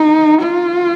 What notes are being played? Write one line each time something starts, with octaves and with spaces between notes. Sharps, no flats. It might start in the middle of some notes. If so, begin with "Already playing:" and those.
Already playing: D#4
F4